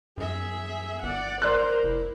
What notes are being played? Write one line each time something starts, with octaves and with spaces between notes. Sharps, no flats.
F#2 G#4 E5
G1 D5 F#5
A#4 C5 D5 C6 F#6
F1 E4